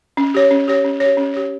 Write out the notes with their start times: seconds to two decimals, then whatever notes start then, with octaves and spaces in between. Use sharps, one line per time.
0.17 C#4
0.34 G4 C#5
0.51 C#4
0.68 G4 C#5
0.85 C#4
1.00 C#5
1.05 G4
1.17 C#4
1.34 G4 C#5